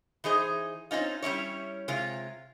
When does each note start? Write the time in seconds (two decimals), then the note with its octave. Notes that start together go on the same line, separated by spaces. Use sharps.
0.24 E3 D#4 G#4 C5
0.91 C4 C#4 D#4 F4
1.23 G3 C#4 E4 C#5
1.88 C3 G#3 F4